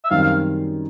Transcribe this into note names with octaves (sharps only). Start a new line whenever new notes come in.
E5
F#2 D#3 G3 C4 F5
F5